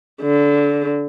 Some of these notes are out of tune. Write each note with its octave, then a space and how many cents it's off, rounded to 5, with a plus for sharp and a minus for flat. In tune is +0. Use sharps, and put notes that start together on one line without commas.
D3 -20